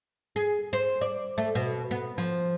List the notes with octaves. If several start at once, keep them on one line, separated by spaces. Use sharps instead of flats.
G#4
C5
D5
A3
B2
B3
F3